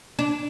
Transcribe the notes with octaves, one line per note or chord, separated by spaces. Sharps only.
D4